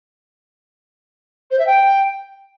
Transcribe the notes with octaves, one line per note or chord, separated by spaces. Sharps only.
C5
E5
G5